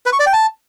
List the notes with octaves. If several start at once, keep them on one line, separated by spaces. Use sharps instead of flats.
B4
C#6
D5
G5
A5